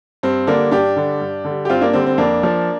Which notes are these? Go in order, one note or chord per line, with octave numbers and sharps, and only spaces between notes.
G2 C4
D3 G3 A#3 D4
G2 D4 G4
D3 G3
G2
D3 G3
G4
G2 C4 F4
A#3 D4
D3 G3 C4
C4
F2 A#3 D4
F3